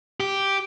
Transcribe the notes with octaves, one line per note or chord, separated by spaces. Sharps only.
G4